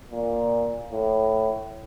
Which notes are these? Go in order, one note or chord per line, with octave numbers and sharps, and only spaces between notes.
A#2
A2